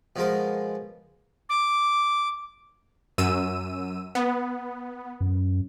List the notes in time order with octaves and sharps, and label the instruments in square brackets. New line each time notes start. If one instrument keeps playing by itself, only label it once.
[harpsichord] B2 F3 G#3 A#4
[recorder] D6
[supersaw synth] F#2 E6 D#7
B3
[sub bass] F#2